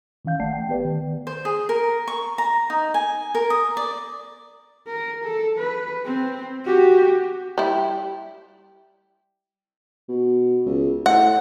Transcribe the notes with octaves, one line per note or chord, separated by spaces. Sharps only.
D#3 E3 C#4 F5 G6
G#1 A3 D5 F#5 A5 C7
G5
B3 G4 B4 D5
D#3
C5
G#4
A#4
C#6
A#5
D#4
G#5
A#4
D#6
D5
A#4
A4
B4
C4
F#4 G4
G3 E4
B2
C#2
A2 F#5